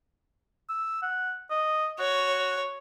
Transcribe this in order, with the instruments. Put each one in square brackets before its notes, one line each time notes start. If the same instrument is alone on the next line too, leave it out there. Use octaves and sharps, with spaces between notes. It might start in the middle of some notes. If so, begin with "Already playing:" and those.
[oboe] E6
F#5
D#5
[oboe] F#4 [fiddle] C#5